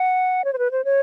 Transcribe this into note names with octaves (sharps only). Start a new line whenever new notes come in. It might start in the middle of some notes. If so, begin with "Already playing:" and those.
Already playing: F#5
C#5
C5
B4
C5
C#5